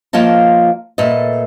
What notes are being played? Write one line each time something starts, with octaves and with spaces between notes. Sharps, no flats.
F3 A#3 F4 C#5 D#5 A5
A#2 A3 B4 D#5